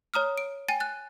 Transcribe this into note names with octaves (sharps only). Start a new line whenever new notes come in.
C#5 A#5 D#6 F6
D7
G5 G#5 A6 D#7
F#6 A6